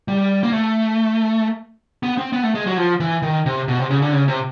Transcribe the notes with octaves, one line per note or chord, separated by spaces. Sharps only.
G3
A#3
A3
B3
C4
B3
A3
G#3
F#3
F3
E3
D#3
C3
B2
C3
C#3
D3
C#3
C3